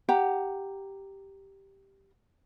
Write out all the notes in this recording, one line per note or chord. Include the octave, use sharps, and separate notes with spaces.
G4 F#5 A#5